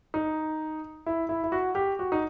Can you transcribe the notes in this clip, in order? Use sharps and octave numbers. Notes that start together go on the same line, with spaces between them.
D#4
E4
E4
E4
F#4
G4
F#4
D#4